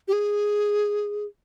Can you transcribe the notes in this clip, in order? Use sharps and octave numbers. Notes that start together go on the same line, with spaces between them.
G4
G#4